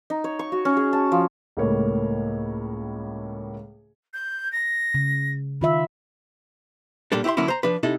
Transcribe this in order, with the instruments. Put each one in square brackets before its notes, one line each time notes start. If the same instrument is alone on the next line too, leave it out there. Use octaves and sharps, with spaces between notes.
[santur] D#4
C#5
C#6
F#4
C#4
G#4
A5
F3
[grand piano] C#2 A2 A#3 A4 C#5
[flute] G6
A#6
[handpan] C#3
[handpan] D#3 F4 E5 [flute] B5
[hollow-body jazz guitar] A#2 G3 A#3 D4 A4
E4 G4 C5 E5 C6
D3 F#3 A#3 C#4 E4
C5 A#5
F3 D4 B4
C3 D#4 E4 A4